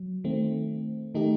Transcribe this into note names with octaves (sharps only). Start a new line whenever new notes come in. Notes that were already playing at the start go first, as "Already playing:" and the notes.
Already playing: F#3
D#3 A3 C4
D#3 A3 D#4 G4